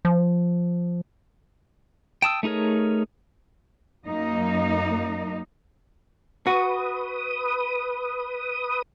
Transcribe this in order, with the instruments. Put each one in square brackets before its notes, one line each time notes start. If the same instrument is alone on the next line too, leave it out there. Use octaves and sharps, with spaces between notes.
[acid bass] F3
[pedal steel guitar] G5 A5 D#6 E6
A3 D#4 G#4 A#4 C#5
[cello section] F#2 A#3 D#4 D#5
[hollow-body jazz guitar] F#4 [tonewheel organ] B4 D#6